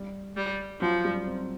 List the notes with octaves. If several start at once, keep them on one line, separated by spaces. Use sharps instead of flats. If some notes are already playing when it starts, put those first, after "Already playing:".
Already playing: G3
G3
F3 F#3
G3
C4